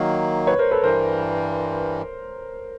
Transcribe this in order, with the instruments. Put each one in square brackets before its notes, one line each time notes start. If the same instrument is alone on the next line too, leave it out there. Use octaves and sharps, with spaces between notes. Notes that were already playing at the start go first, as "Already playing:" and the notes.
Already playing: [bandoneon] D#3 F#3 A#3
[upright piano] B4 C#5
A#4 C5
A4 B4
[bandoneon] G2 E3 G3 [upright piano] A#4 C5